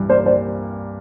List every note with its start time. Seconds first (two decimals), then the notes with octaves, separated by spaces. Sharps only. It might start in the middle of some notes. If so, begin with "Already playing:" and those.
Already playing: C2 G2 E3
0.09 A#3 C5 D5
0.26 G3 C5 D5